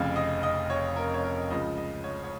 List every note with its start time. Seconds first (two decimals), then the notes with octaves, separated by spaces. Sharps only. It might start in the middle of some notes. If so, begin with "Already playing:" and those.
Already playing: F1 F2 C#3 F5
0.16 D#5
0.43 D#5
0.70 C#5
0.96 A#4
1.14 C#5
1.24 A#4
1.50 C#2 C#3 F3 D#5
1.77 D#5
2.04 C#5
2.24 C#5